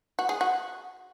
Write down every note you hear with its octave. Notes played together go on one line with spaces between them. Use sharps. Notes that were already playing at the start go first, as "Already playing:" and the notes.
F#4
G#4
F#4